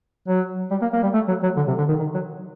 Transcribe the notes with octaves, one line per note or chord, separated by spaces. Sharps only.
F#3
G3
A#3
A#3
G3
A3
F#3
F#3
D3
C3
D3
D#3
D#3
F#3